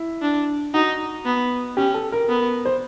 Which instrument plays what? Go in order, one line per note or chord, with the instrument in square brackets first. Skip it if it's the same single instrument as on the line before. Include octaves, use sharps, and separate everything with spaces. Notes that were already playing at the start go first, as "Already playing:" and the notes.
Already playing: [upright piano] E4
[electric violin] D4
[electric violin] D#4 [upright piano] F#4
[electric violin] B3
[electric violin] C#4 [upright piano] G4
[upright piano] A4
A#4
[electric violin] B3
[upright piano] C5